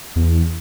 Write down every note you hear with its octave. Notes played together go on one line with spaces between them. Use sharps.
E2